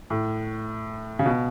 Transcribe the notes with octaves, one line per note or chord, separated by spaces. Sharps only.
A2
C#3
B2